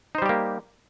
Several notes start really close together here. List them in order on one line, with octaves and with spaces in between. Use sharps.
D#4 C5 G3 G4 A#3